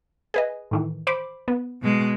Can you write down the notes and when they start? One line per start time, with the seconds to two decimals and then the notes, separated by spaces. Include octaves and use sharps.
0.34 G#4 B4 D#5
0.71 A2 D#3 E3
1.07 C5 B5 D6
1.48 B3
1.82 B2 G#3